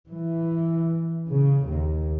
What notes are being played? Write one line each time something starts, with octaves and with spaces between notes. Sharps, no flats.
E3
C#3
D#2